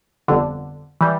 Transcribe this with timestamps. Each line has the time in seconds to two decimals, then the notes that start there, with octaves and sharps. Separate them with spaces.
0.28 G1 F2 D3
1.01 E3 G3